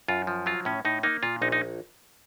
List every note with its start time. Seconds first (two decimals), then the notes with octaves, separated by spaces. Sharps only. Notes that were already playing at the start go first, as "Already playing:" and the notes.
0.08 F#2 F4
0.27 F3
0.46 F#3 F4
0.65 A2 C#4
0.85 A2 D#4
1.03 A#3 D#4
1.23 A#2 F4
1.42 A#1 D#4
1.52 D#4